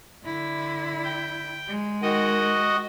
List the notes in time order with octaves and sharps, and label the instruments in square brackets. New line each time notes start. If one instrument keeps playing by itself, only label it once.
[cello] D3 E4
[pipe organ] G5
[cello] G#3
[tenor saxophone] D#3 [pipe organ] F#4 D#5